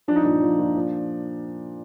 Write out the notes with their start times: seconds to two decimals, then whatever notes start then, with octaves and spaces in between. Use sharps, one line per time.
0.08 F3 D4
0.16 D#4
0.23 A#2 D4
0.42 F3
0.59 A#2
0.76 F3